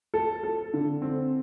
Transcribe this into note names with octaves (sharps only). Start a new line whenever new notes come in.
A4
A4
D3
C4